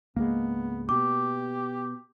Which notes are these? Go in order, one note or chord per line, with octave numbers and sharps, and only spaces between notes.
C#2 G#2 G#3 A#3 B3
B2 G4 D6